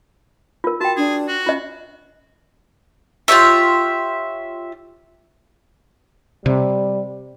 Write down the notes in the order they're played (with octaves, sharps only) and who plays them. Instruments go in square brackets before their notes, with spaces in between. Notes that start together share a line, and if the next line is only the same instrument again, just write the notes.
[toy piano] F4 A#4
[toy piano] F#4 G5 [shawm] A5
[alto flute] D4 [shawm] G#4
[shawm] F#4
[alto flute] C#4 [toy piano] F4 D#5
[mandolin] F4 G4 C#5 E5
[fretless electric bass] C3 [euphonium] G3